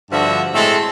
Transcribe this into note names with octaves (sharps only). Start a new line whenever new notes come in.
G2 D3 F3 F#4 E5
A2 G#3 A3 C4 A4